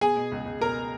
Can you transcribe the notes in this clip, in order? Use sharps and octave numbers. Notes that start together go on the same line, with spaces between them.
B2 G#4 G#5
B2
C#2
C#2
B2 A#4 A#5